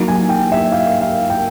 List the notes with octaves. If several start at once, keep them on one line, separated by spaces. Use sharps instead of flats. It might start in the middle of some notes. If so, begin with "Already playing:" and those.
Already playing: F#3 A#3 D#4
G#5
G5
E5
F5
F5
G5